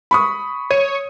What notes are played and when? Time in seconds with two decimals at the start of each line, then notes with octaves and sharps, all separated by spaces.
0.11 B5 C#6 D#6
0.71 C#5 D#7